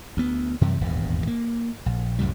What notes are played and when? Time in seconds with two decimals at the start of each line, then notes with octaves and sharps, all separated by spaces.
0.17 D2 B3
0.61 F#2 C3 E3 G3
0.81 D#1 G#1 E2 G2
1.27 A#3
1.86 A#1
2.19 C2 F#2 A2 G3